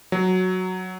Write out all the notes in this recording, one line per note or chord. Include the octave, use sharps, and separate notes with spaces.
F#3